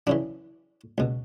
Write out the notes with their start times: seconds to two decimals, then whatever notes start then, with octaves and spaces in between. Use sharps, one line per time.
0.07 F#2 C#3 E3 D4
0.98 C#2 B2